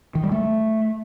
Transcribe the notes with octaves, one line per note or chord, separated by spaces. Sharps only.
D#3
G3
A3